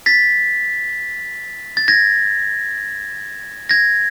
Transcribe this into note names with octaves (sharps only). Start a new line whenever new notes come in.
A6 B6
A6
G#6 A#6
G#6 A#6